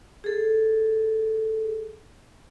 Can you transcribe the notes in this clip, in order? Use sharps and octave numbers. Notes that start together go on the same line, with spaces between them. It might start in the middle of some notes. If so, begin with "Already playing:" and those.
G#4 A4